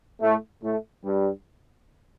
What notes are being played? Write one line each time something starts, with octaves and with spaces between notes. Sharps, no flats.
A2 A3
A2 A3
G2 G3